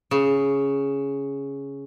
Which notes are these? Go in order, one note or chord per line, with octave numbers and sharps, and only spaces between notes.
C#3